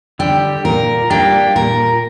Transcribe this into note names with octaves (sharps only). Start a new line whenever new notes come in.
D3 G3 G4
A#2 A#4
G3 A#3 D4 G4
A#2 A#4